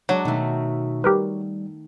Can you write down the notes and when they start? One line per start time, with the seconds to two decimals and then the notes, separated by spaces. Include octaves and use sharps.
0.09 F#3 G#3 D4 F#4
0.25 B2 D#3 A3 E5
1.04 G3 G4 A#4 B4